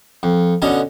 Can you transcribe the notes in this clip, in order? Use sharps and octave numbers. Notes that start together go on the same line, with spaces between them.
F2
B2 D3 C#4 D#5